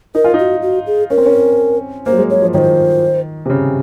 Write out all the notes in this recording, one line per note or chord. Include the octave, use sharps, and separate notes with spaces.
D#4 A#4
F4
D#4
F#4
F#4
G#4
C#4 A#4
C4
C#4
A#3 C5
F#3
G#3
F#3 C#5
F3
D#3 C5 C#5
C3
C#3